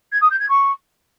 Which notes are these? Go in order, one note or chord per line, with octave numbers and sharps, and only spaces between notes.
G#6
D#6
G6
G#6
C#6